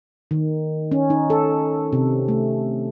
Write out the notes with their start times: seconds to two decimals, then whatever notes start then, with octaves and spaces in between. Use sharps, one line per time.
0.31 D#3
0.91 C#4
1.10 D#4
1.30 A4
1.93 C3
2.28 A3